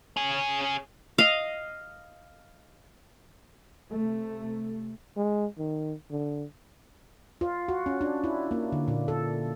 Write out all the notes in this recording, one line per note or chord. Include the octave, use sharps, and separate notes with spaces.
C#4 G#4
D#5 F5
C3 A3
G#3
D#3
D3
F4
F#4
C#4
D4
E4
A#3
D3
A#2
A4